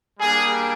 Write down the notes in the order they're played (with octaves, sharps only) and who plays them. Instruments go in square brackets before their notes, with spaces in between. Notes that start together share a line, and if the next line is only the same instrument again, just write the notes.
[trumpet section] G3 A#3 D4 G#4